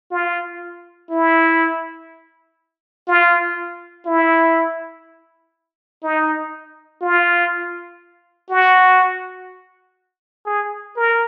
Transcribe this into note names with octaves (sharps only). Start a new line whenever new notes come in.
F4
E4
F4
E4
D#4
F4
F#4
G#4
A#4